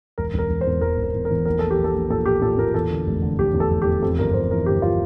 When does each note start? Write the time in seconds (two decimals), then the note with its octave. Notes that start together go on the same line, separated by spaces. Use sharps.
0.18 E1 A#4
0.34 E1 A#4
0.50 E1
0.61 C5
0.66 E2
0.81 E1 A#4
0.98 E1
1.04 A#4
1.14 E2
1.25 A#4
1.31 E2
1.45 A#1 A#4
1.59 A#1 A4
1.71 G4
1.79 A#1
1.84 A4
1.94 A#1
2.10 A#2 A4
2.26 A#2 G4
2.42 A#2 A4
2.58 A#2 A#4
2.74 E2 A4
2.90 D3
3.07 F1
3.22 D3
3.38 F1 G4
3.54 E2
3.60 A4
3.70 F1
3.82 G4
3.86 E2
4.02 F2 A4
4.18 G1 A#4
4.34 F2 C5
4.51 E3 A#4
4.66 G1 G4
4.82 F4